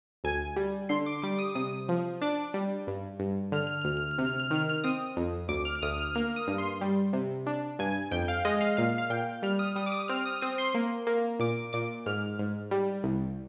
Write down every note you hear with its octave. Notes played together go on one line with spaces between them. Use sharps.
D2 G#5
G3
D3 C6
D6
G3 D6
D#6
C3 D#6
F3
D4 D6
G3
G2
G2
D3 F6
F6
F6
D2
F6
F6
C3
F6
F6
D#3
F6
F6
C4 D#6
F2
D2 D6
F6
F6
D2 D#6
F6
A#3 F6
D#6
G2
C6
G3
C3
D4
G2 G#5
F2 G5
F5
G#3 D#5
F5
A#2 F5
F5
A#2 G5
G3 F6
D#6
G3 D#6
D6
D#6
C4 F6
D#6
C4 D#6
C6
A#3
A#3
A#2 D6
A#2 D6
G#2 F6
G#2
G3
C2